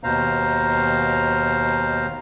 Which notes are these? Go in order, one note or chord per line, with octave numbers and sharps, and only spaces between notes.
D#2 B2 C5 F5 A#5